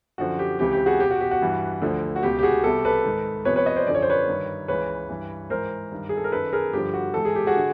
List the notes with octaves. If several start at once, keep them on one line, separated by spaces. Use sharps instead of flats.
F#2 D3 F3 F#4
G4
C#2 C3 E3 G4
G4
F#4 G#4
E2 B2 G4
F#4
G4
F#4
G2 E3
D2 D3 F3
F#4
C#2 B2 G4
G4
F#4 G#4
C2 B2 G4 A4
A4 B4
G#2 D#3
E2 C3 F3 B4 C#5
B4 C#5
C#5 D#5
C5 D5
F#2 D3 F3 D5
C#5
C5
B4 C#5
G2 D#3
C#2 C#3 E3 B4 C#5
G2 E3
G#2 E3 A#4 C5
G2 D#3
G#4
A4
A#4
F#2 D#3 A4 B4
G#4 A#4
G2 D3 F3 G4
F#4
G#2 E3 A4
G#4
G4
F#4 G#4
D3